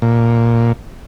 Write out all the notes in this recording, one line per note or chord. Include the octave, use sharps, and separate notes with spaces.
A#2